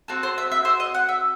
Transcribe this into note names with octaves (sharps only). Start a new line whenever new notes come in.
C4 F#4 A4
C5
E5
E5
C5
D#5
F#5
E5